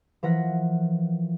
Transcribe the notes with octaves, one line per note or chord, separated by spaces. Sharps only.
E3 F3 A#4 F#5 A#6 B6